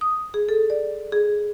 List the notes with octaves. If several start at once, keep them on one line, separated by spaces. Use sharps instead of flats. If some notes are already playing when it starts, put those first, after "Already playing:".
D#6
G#4
A4
D5
G#4